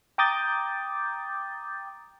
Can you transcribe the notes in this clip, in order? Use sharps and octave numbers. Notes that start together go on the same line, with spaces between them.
G5 A#5 D6 D#6 G6 A6